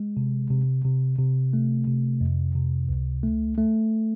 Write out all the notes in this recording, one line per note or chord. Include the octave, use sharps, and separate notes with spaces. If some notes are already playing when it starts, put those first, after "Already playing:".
Already playing: G#3
C3
C3
C3
C3
A3
C3
F2
C3
C#2
A3
A3